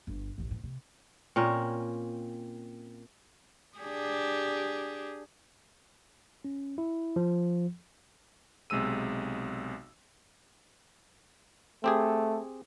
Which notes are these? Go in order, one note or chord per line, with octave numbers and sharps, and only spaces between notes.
G1
A1 D#2
E2 A2
C3
A#2 C4 C#4 A#4
D4 G4 G#4
C#4
E4
F3
B1 C3 G#3 E6 D#7
A3 C4 G4 G#4